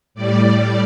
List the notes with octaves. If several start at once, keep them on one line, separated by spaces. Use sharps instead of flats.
A2 G3 D5